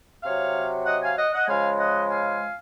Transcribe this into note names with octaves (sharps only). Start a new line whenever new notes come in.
C3 F#3 C#5 F5
D#5 F#5
F5 G#5
D#5 F#5
D#5 F#5
C#3 F3 G#3 F5 G#5
D#5 F#5
F5 G#5